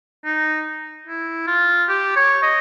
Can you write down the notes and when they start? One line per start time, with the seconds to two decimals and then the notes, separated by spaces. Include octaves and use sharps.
0.25 D#4
1.07 E4
1.47 F4
1.89 G4
2.16 C#5
2.43 D#5